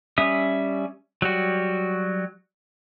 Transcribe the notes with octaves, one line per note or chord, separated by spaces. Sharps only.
G3 C#4 E5 D#6
F#3 G3 F#4